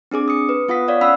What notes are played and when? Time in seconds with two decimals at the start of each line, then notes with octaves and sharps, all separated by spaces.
0.11 C4 D4 G#4 D6
0.28 D#6 C#7
0.49 B4
0.68 B3 F4 F#5 D#6 B6
0.88 C#5 D5 F5
1.01 C#4 F#5 B5 E6 B6